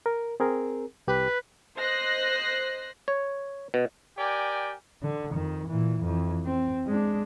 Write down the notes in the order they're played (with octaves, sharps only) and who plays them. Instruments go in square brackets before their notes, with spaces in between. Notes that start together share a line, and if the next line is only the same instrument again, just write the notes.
[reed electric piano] A#4
C4 G#4 A#4
[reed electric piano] C2 G4 [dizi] B4
[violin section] C5 D#5 F#6 A#6 C7
[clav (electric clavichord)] C#5
B2
[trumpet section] G4 A#4 D5 G5 G#5
[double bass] D3
F2 D#3
A#2 E3
F2 E3
C4
G#3 D4